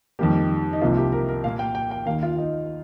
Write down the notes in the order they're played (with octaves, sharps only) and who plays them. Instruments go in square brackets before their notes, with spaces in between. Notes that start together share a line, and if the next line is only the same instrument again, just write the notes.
[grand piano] F2 D#3 G3 A#3 G4
D#4
C2 C3 F3 A#3 F4
G4
A#4
A#4
A#2 A#3 F5
G5
G5
G5
D#2 D#3 A#3 F5
F4
D#4